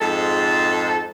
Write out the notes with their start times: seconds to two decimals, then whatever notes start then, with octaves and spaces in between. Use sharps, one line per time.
0.01 F2 G#2 G#3 A4